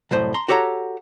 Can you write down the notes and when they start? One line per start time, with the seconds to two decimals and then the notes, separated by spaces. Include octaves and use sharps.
0.11 C2 F#2 A2 C5
0.34 A#5 C6
0.48 F#4 G4 A4 C#5 F#5 A#5